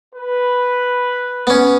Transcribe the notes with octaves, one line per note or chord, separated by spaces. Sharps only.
B4
B3 C#4